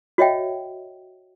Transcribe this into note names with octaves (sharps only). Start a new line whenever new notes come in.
F#4 C#5 D#5 E5 G5